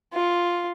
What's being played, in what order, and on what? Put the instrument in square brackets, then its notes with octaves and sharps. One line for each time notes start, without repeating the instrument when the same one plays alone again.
[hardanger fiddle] F4